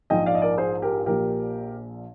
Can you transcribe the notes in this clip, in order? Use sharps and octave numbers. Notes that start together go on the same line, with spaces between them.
A#1 G#2 F3 D#5 G5
D5 F5
D#5
A#4 D5
G#4 C5
G4 A#4
A#1 A#2 F3 G4 A#4